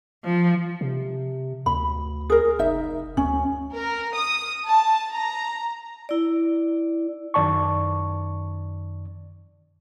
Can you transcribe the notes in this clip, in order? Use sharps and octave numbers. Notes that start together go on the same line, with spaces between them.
F3
C3
D2 B5
G#4 A#4
F1 D#4 E5
D2 C#4
A#4
D#6
A5
A#5
E4 D5
F#2 D#3 D5 A5 C#6